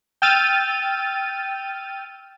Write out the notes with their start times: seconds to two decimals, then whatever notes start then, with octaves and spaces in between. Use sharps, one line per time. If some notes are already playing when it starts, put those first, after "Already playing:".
0.22 G5 E6 F6 A6 D#7